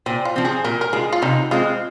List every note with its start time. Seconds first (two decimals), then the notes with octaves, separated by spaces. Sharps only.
0.06 A#2 C4
0.25 F4
0.36 F3 C4
0.45 G#4
0.64 A#2 A#4
0.81 A#4
0.93 G#3 F4 G#4
1.12 F4
1.22 C3 D#4
1.51 G#3 C4 F4